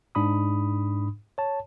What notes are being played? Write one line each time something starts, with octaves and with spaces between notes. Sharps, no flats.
G#2 D4 B5 D#6
C#5 A5